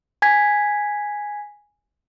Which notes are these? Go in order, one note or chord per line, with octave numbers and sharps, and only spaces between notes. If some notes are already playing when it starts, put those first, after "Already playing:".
G#5 G#6 B6